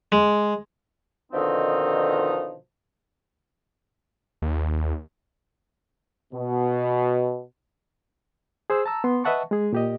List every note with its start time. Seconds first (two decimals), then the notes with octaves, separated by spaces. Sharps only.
0.12 G#3
1.32 B2 D3 D#3 F3 C4 D#4
4.42 D#2
6.33 B2
8.70 G#4 C5 E6
8.86 A5 A#5 E6
9.04 B3 C6
9.24 B4 D#5 E5 F#5 A5 C#6
9.51 G#3 G#4
9.73 A#2 G4 D#5